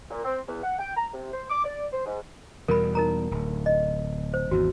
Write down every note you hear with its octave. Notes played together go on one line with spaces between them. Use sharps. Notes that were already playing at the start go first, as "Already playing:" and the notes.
A#2
C4
E2
F#5
G5
A#5
C3
C5
D6
D5
C5
G#2
E2 B2 G3 A#4 B5
D#4 A#4 A#5
D1
D#5
C5
G#1 E2 F#4